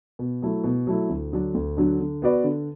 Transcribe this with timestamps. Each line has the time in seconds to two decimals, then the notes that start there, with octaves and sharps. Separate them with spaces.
0.19 B2
0.42 F#3 A3 E4
0.64 B2
0.87 F#3 A3 E4
1.09 D2
1.33 D3 F#3 D4
1.54 D2
1.77 D3 F#3 D4
2.00 D3
2.22 B3 F#4 B4 D5
2.44 D3